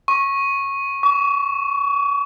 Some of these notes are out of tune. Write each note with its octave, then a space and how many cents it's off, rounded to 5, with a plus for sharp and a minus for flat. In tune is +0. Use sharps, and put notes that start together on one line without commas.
C#6 -15
C#6 +35